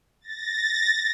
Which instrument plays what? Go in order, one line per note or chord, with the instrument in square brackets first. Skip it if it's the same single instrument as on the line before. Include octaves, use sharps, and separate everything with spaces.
[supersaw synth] A6 A#6